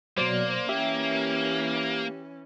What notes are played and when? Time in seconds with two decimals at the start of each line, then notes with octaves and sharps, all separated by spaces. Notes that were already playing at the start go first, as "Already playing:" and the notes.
0.17 B2 F#3 A#3 C5 D5 C6
0.69 E3 C#4 G4 E5